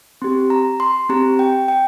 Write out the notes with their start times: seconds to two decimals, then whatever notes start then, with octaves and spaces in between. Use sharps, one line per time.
0.22 C4 G4 C6
0.50 A#5
0.80 C6
1.09 C4 G4 A#5
1.39 G5
1.68 G5